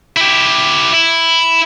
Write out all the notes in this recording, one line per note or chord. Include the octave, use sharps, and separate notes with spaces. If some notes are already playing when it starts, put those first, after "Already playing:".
E4 G4
E4